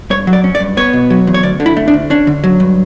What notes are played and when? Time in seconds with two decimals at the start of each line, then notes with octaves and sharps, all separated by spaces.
0.10 G2 C#5
0.27 F#3
0.33 D5
0.44 C#4
0.55 D5
0.60 G2
0.77 B3 C#5
0.93 B2
1.10 F#3
1.27 E2
1.34 C#5
1.43 D2 D5
1.60 D3
1.66 E4
1.77 A3
1.88 D4
1.93 D2
2.10 C#4 D4
2.27 D3
2.44 F#3
2.60 G2